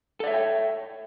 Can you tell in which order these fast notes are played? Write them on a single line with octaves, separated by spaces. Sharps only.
A4 D5 E5 C#5 G5